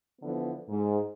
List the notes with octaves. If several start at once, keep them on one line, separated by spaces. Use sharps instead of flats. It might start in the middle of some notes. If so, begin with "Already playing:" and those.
D3 E3 F3 B3
G#2